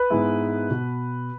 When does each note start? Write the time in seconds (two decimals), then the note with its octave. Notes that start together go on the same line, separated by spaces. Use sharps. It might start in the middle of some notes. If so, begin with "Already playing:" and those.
Already playing: B4
0.10 G#2 G#3 B3 E4
0.70 B2